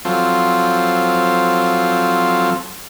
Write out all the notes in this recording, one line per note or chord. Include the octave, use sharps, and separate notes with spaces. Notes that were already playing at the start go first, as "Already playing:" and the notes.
F3 F#3 C4 F4 A4